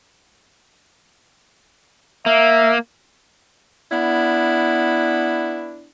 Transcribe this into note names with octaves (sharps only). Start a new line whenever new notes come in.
A#3 E5
B3 D4 E4